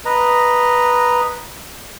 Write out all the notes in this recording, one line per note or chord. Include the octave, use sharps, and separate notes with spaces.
B4 D#5 A#5